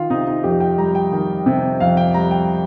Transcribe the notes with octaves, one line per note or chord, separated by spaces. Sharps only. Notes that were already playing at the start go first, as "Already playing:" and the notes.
Already playing: D#3 F4
C3 D#4
D#4
F2 G4
G5
G3 A#5
G5
D#3
C3
F2 F5
G5
G3 A#5
G5